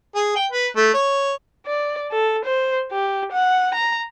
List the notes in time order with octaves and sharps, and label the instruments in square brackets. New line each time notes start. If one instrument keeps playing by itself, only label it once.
[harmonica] G#4
G5
B4
A3
C#5
[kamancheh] D5
A4
C5
G4
F#5
A#5